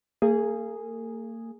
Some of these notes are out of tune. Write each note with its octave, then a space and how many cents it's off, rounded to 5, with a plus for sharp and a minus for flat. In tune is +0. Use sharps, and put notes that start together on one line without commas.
A#3 -40 G#4 -5